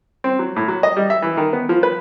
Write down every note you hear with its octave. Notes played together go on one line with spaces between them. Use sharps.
C4
F#3
A2
F#3
D#5
G3
E5
E3
D#3
B3
F3
B4